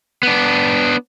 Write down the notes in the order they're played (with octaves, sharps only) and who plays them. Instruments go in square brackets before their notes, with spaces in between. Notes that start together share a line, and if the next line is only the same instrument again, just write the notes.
[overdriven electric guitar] B3 D4